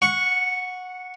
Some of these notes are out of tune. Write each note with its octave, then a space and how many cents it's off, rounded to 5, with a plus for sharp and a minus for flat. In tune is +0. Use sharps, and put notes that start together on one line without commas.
F#5 -15 C#6 +0